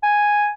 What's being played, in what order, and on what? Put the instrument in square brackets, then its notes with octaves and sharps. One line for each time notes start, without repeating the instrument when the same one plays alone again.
[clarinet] G#5